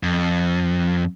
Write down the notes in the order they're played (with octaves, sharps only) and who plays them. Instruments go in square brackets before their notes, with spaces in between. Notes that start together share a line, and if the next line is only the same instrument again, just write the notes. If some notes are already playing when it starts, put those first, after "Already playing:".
[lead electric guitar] F2